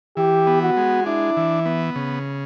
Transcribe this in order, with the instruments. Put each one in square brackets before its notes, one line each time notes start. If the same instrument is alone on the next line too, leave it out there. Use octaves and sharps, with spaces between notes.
[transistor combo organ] E3 [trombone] G4
[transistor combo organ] B3
[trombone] F#4
[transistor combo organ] G#3
[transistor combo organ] D4 [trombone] E4
[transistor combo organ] E3
B3
C#3